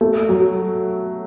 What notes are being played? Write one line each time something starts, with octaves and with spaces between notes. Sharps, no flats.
A3
F#3